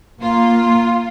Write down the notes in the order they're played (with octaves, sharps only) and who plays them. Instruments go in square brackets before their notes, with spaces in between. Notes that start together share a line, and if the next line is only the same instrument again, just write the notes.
[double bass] A#3 [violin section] F4 [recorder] C6